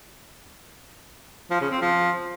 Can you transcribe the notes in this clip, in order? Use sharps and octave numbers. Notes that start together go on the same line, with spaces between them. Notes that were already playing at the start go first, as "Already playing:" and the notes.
F3
C#3
C4
F3